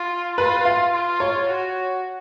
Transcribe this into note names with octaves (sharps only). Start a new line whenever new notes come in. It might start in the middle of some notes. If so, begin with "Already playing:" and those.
Already playing: F4
F4 B4
F5
F4
C#5
F#4